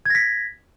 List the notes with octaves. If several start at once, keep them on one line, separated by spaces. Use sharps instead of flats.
G#6 A#6 B6